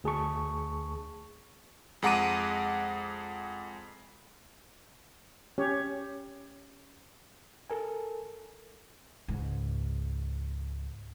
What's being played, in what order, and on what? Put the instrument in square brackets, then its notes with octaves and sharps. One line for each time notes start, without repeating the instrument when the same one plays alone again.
[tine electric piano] D2 G#4 A5 C#6
[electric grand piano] F2 G#3 F#5 A#5 D6 D#7
[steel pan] C#4 G4 C#5
[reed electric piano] A4 A#4 G#5
[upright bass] C#2 G#2